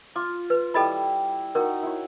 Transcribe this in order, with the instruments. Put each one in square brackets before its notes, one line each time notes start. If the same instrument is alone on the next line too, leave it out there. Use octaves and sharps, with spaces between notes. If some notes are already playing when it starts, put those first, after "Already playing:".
[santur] F4 [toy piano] D6
[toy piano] B4
[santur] G3 E4 [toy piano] A4 D#5 B5
[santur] D#4 F#4 [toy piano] A#4
[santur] E4 C#5